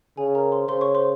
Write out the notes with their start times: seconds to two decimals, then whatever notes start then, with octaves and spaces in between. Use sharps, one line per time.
0.17 C#3 G#4 G#5
0.35 A#4 A#5
0.52 C5 C6
0.68 C#3 C5 C6
0.81 C#5 C#6
0.95 C5 C6